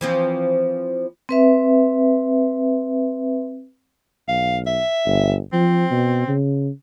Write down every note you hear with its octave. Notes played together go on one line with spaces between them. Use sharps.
E3 F3 C4
C4 B4 E5
B1 F5
E5
G1
F3 C4
B2
C#3